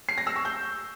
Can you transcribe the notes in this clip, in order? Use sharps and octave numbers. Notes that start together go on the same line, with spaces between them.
C7
A#6
E6
C#6
G6